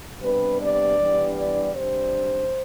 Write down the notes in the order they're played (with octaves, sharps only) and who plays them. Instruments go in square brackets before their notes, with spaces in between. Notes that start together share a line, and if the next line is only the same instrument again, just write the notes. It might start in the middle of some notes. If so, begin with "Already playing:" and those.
[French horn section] C3 G3 B3 D4 B4
D5
G2 E3 G3 B3 D4
D5
C3 G3 D4 C5